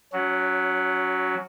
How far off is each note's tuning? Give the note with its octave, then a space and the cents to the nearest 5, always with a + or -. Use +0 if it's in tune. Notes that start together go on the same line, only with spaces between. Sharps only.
F#3 +0 C#4 +30 F#4 +0